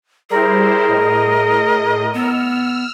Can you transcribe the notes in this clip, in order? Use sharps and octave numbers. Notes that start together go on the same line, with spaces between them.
G3 E4 G#4 A#4 C5
A2 D#5
B3 E6 F6